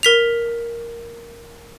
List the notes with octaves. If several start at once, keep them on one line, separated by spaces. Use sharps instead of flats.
A#4 B6 F7